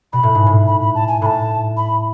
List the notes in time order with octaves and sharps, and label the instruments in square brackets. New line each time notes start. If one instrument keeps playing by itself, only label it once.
[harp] B2 [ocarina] B5
[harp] A2
G#2
A2
[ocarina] B5
B5
A5
G#5
[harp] A2 [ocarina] B5
[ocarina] A5
B5